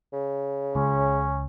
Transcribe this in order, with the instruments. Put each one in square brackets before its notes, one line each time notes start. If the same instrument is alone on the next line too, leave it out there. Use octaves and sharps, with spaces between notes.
[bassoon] C#3
[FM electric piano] C#2 [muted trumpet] C#4